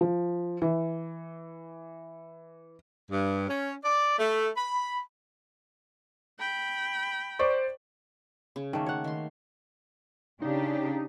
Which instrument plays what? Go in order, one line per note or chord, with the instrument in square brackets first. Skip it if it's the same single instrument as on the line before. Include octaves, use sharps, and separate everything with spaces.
[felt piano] F3
E3
[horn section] G2
C#4
D5
A3
B5
[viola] G5 B5
[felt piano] C5 D5 C#6
[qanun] C#3
[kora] D#3 A3 A#3
C#5 F#5
[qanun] D#3 C6
[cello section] C#3 D4 G4 [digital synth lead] D#4